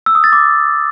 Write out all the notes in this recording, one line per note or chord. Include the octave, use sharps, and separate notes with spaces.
E6
D#6
A6
D6